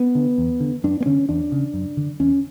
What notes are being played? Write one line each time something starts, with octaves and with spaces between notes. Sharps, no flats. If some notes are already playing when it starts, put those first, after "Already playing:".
Already playing: B3
D3
E2
D3
F#2 D4
B3
D3 C#4
E2 D4
C#3
F#2
D3
E2 C#4